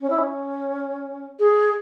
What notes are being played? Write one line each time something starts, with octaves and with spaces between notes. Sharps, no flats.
C#4
E4
C#4
G#4